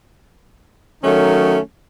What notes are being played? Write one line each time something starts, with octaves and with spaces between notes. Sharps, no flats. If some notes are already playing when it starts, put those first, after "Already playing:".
D#3 F#3 A3 C#4 D#4